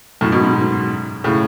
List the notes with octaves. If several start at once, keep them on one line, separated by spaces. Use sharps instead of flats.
F#2 A2
G#2 B2
G#2 B2
A2 C#3